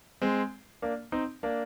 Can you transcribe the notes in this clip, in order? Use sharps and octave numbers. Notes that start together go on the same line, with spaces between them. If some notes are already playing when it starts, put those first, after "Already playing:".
G#3 C4
A#3 D4
C4 D#4
A#3 D4